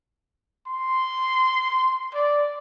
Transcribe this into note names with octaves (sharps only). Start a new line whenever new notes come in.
C6
D5